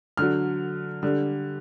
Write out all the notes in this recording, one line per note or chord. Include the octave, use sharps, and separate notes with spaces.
D3 F#3 F6
D3 G3